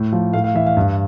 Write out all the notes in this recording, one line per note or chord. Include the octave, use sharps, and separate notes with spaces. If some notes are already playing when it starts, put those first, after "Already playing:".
Already playing: A2
F3
A2 F5
F5
E3 E5
F5
G2